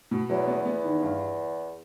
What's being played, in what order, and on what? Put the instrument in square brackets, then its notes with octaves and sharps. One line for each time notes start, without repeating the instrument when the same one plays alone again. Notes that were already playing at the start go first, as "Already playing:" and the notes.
[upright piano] B2
[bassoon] E2 [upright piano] F#3
[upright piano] B3
B3
D#3
G2